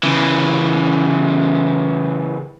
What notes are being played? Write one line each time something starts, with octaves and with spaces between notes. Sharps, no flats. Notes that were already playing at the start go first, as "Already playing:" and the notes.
C#3 E3